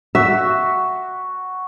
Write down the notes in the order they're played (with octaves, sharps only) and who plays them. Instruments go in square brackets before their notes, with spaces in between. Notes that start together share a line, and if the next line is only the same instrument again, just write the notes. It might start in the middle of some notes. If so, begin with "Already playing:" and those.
[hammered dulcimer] F#4 [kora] E5